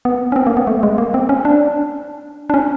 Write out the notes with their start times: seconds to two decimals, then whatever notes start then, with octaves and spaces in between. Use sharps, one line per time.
0.05 B3
0.32 C#4
0.36 C4
0.47 A#3
0.57 B3
0.67 A3
0.83 G#3
0.98 A#3
1.14 C4
1.29 C#4
1.45 D4
2.50 D4
2.54 C#4